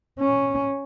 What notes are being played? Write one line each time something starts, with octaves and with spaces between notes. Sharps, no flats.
C#4